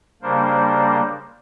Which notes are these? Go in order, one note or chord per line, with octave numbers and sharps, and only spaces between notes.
C#3 G3 A#3 D4 A#4 C5